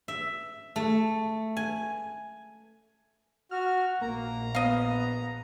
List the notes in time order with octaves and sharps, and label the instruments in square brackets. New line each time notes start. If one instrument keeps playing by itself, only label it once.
[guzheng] E5
A3
G#5
[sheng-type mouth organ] F#4 [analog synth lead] F6
[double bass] A#1 [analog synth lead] A#3 [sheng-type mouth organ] A#5
[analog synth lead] B3 [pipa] D#5 F5